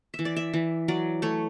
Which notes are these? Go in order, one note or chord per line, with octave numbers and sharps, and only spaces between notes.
E5
E3
D5
E5
E3
F#3 D5
A3 C#5